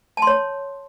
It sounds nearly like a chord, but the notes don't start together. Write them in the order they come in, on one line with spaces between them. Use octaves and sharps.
A5 C6 C#5